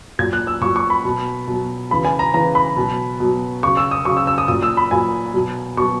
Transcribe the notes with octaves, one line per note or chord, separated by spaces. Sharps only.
A#2 F#3 G#6
F#6
E6
A#2 F#3 C#6
C#6
B5
B2 F#3
B2 F#3
C#3 E3 B5
G#5
A#5
C#3 E3 A#5
B5
B2 F#3
B2 F#3
C#3 F#3 C#6
E6
D#6
C#3 F#3 C#6
E6
E6
D#6
A#2 F#3 D#6
E6
B5
A#2 F#3 G#5
B2 F#3
B2 F#3 C#6